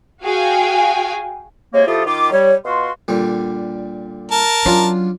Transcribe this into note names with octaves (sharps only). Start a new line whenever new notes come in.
F#4 G#4 F5 G5 G#5
C3 G#3 A#3 C#5
F3 E4 F4 G4 A4 D#6
D#3 F4 D6
G3 C#5
B2 F4 F#4 C6
A#2 D3 G3
A#4 A5
F#3 C#4 D4 F4